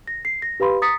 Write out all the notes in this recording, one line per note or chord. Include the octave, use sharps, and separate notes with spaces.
A#6
C7
A#6
G4 B4 F5 B5 C6
A#5 D#6 A6 B6 C#7